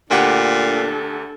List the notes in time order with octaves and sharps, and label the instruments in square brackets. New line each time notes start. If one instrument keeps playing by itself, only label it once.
[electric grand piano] D2 G4 F#5 [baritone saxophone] A#2 [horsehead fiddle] D4 A4